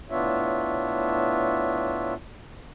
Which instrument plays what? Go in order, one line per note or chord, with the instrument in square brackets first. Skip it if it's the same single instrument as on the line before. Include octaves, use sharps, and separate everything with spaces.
[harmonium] A2 B3 D4 F4 C#5 E5